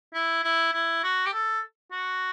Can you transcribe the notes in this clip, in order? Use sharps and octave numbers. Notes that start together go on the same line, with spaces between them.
E4
E4
E4
F#4
G4
A4
F#4